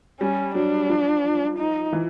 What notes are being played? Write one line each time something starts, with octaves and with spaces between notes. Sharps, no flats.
G3 C#4
F#3 D4
F3
D#4
E3